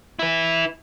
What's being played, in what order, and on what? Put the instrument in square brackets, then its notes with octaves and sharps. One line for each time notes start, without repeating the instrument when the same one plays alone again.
[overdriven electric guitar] E4 B4